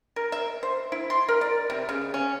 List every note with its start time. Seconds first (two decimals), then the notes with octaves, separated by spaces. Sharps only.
0.16 A#4
0.32 E5
0.63 C5
0.92 E4
1.10 C6
1.28 A#4
1.41 D5
1.70 C3
1.89 C#3
2.14 C#4